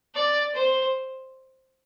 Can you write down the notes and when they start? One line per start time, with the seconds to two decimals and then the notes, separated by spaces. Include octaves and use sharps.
0.15 D5
0.55 C5